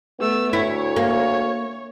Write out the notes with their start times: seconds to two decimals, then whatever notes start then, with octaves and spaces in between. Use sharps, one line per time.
0.19 A3 B3 E6
0.53 D2 E4 C#5
0.96 A#3